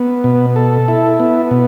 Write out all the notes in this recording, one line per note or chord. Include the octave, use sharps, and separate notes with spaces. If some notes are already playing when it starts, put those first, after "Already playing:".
Already playing: B3
B2
A4
E4
B3
B2